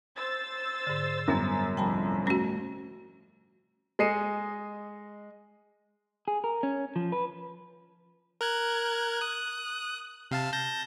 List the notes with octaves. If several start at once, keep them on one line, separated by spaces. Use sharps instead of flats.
C5 E6 A6
G#2 D3
F#2 G3 B3
C2 F2 G5 A5 B5
A3 C#4 F#4
G#3 D#5 C7 C#7 D#7 E7
G#4
A#4
C#4
F3
B4
A#4 F#6 G#6
D#6 F#6
C3 F5 A5
A5 G6 A#6